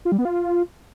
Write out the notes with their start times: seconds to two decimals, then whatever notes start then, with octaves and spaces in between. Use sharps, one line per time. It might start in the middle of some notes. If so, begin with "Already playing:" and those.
0.05 F4
0.12 G3
0.18 B3
0.25 F4